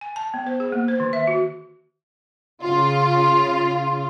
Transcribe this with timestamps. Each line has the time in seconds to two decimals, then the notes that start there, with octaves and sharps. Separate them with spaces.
0.01 G#5
0.16 A5
0.34 B3
0.47 C5
0.60 G#4
0.72 A#3
0.88 C5
1.00 D#3
1.13 E5
1.27 F#4
2.62 C#3 F4